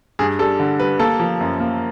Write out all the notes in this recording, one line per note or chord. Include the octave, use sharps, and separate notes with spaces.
G2 G#4
G3 A4
D3
G3 B4
A#3 A4
F3
F#2
A#3